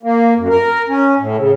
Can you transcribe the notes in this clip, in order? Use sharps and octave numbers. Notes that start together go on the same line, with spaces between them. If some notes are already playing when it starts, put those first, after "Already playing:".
A#3
F#2
A#4
C#4
A2
C#3